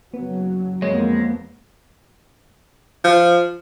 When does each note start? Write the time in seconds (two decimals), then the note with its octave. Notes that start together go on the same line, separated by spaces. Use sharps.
0.14 F#1 F#3 B3
0.82 F2 G#3 A#3 B3 C#5
3.04 F3